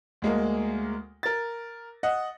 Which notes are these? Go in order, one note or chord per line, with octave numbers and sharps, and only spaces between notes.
D2 G#3 A#3
A#4 A6
D#5 F#5